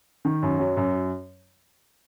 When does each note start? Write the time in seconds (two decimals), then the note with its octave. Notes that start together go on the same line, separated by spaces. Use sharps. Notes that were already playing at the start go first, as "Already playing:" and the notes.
0.25 D#3
0.43 F#2
0.59 F#3
0.77 F#2